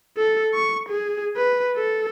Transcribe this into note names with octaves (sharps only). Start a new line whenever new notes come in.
A4
C#6
G#4
B4
A4